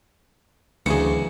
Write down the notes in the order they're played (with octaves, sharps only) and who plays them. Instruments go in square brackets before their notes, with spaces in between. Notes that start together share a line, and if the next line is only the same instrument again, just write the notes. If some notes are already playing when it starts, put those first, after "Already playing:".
[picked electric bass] D2 [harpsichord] C#3 E3 F#3 [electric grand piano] G#4 C#7